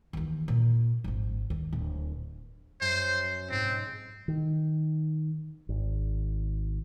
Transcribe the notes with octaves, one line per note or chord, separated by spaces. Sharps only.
D#2 E3
A#2
G#1 F2
D#2
D1
F#2 C5 A6
B1 G#2 C4
D#3
G#1